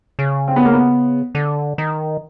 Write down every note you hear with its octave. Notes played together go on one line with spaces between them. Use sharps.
C#3
C4
B3
A#3
B3
D3
D#3